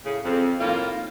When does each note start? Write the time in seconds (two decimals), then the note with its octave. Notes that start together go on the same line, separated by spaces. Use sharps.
0.05 A2 C#3
0.24 F2
0.61 A2 D#3 A#3 F4